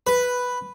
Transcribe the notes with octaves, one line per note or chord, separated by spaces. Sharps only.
B4